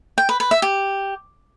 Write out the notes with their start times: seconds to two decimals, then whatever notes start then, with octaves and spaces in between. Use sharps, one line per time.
0.18 G5
0.29 B4
0.40 B4
0.51 E5
0.62 G4